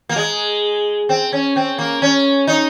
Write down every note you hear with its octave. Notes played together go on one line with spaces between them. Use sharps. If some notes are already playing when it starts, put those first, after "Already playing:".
A#3
G#3
C4
C#4
C4
A#3
C#4
D#4